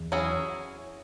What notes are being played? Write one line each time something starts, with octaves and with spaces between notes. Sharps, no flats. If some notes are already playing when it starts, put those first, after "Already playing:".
Already playing: E2
F#3 C#4 E4 G#4